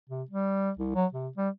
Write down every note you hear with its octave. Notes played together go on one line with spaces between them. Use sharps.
C3
G3
C2
F#3
C3
G3